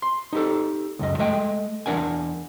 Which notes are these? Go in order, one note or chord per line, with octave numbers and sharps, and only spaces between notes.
C6
D#4 G4 A4
C#2 F#2 D#5
G#3 A3 D#5 G5
E2 B3 D4 A#4 F#5 G#5